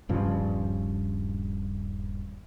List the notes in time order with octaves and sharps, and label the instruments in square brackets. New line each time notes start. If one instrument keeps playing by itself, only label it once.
[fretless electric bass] D#1 G2 C#3 F3